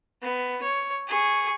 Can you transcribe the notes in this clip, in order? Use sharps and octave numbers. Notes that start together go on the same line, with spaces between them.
B3
C#5
G#4 C#6